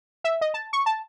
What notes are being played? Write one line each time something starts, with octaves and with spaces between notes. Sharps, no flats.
E5
D#5
A5
C#6
A5